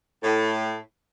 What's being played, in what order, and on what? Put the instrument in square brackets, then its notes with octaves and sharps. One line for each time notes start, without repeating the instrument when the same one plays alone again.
[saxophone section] A2